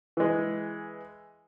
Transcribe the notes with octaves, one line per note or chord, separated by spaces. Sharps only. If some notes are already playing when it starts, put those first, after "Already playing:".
E3 G#3